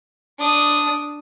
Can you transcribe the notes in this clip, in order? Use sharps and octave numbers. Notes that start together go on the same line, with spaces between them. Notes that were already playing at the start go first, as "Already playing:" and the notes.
D4 D#6